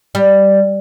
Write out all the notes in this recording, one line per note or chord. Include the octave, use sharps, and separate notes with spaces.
G3